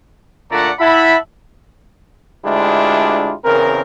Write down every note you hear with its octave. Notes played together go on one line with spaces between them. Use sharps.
A#2 D3 A3 D5 F#5 A#5
E4 E5 F#5 A5 B5
D2 G#3 D4 E4 F4 G4
E2 C#3 C4 A#4